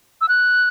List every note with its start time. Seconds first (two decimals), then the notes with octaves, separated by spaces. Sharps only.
0.21 E6
0.29 F#6